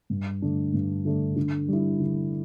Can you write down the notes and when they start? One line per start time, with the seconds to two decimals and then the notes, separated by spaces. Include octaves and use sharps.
0.10 G2
0.42 D3 A3 D4
0.74 G2
1.05 D3 A3 D4
1.36 D3
1.68 G3 E4
2.00 D3